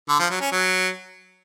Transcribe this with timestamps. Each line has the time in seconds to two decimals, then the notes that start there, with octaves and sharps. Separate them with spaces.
0.09 D3
0.20 F3
0.30 F#3
0.41 C#4
0.52 F#3